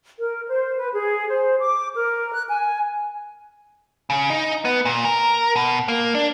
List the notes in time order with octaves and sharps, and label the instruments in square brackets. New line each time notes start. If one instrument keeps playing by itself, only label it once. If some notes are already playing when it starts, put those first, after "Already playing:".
[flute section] A#4
C5
B4
G#4
C5
D6
A#4
F#6
G#5
[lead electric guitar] C#3
D#4
B3
A#2
A#4
B2
A#3
D4